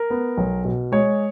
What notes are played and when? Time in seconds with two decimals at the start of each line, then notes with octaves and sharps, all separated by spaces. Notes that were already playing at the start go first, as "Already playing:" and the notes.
Already playing: A#4
0.10 B3
0.38 B1
0.65 B2
0.92 G#3 C#5